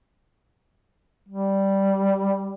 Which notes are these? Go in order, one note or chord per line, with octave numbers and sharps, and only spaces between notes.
G3